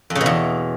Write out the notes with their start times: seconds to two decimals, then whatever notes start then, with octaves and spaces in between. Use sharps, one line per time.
0.10 F2
0.15 C#3
0.21 B2
0.26 E2